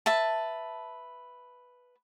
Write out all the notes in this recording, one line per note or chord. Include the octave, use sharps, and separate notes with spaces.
B4 E5 A5